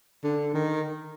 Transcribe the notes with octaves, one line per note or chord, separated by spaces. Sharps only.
D3
D#3